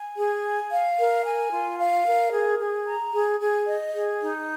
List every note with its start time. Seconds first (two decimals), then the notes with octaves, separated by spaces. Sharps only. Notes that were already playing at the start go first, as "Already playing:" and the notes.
Already playing: G#5
0.17 G#4
0.44 G#5
0.70 F5
0.97 A#4
1.25 G#5
1.51 F4
1.78 F5
2.05 A#4
2.32 G#4
2.59 G#4
2.86 A#5
3.12 G#4
3.40 G#4
3.66 D#5
3.94 G#4
4.21 D#4